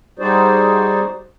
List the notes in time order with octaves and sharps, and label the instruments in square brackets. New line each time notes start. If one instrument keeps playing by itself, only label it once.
[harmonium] G3 D#4 F#4 G#4 C5 D5